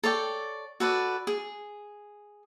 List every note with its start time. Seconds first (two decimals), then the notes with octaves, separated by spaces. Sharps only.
0.03 A4 C#5 D5 G5
0.80 F#4 A4 B4 D5
1.27 G#4